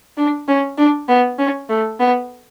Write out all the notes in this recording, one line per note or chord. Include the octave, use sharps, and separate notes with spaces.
D4
C#4
D4
B3
C#4
A3
B3